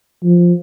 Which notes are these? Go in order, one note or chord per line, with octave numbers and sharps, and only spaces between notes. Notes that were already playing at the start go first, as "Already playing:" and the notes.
F3